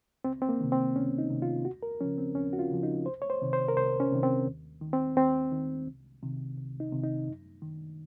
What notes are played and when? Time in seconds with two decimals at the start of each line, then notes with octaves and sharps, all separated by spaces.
0.24 C#2 C4
0.42 C4
0.49 A#3
0.60 C3 D#3
0.72 C4
0.96 C#2 C#4
1.18 D#4
1.30 C3 D#3
1.42 F4
1.65 D#2 F#4
1.83 A#4
2.01 C#3 F3 C#4
2.18 C4
2.35 D#2 C#4
2.53 F#4
2.59 F4
2.71 C#3 F3
2.83 D#4
3.06 C2 C5
3.22 C#5
3.30 C5
3.42 C3 D#3
3.53 C5
3.68 A#4
3.77 C2 C5
4.00 C#4
4.12 C3 D#3
4.23 C4
4.46 D#2
4.81 D#3
4.93 C4
5.17 D#2 C4
5.52 D#3
5.87 C2
6.23 C3 D#3
6.58 C2
6.80 D#4
6.92 C3 D#3
7.04 D#4
7.28 F#2
7.62 D#3